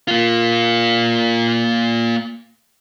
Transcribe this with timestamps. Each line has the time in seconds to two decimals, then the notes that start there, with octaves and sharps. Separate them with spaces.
0.08 A#3 F4